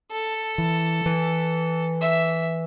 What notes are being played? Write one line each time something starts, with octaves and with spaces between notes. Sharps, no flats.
A4
E3
E3
E5